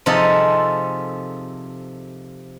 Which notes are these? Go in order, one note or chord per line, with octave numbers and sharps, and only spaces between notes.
C3 F3 D#4 G#4 A4